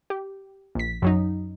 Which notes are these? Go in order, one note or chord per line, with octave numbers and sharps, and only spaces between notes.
G4
A#1 B6
F#2 F#3 D#4